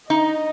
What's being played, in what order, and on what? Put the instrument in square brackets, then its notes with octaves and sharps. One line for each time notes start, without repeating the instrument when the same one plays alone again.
[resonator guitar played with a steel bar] D#4 [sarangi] D#5